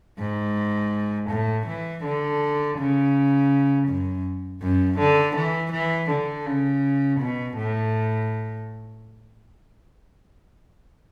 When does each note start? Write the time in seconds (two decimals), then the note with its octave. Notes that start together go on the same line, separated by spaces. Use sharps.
0.18 G#2
1.30 A2
1.67 E3
2.04 D3
2.78 C#3
3.87 F#2
4.62 F#2
4.99 D3
5.35 E3
5.72 E3
6.10 D3
6.46 C#3
7.20 B2
7.57 A2